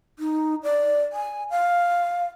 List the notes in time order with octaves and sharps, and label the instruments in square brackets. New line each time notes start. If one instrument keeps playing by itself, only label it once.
[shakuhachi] D#4
D5
G#5
F5